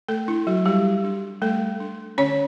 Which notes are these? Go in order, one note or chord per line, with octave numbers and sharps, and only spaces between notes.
A3 A4
D4 E4
F#3 F#4
G3 G4
D4
G3 A3 A4
D4
D3 C#4 C#5